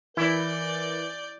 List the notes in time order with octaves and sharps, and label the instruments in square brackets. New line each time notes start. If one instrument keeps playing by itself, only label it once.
[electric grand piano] E3 [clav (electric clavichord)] E4 [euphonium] A#4 [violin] D5 G6